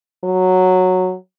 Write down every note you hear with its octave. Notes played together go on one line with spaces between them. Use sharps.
F#3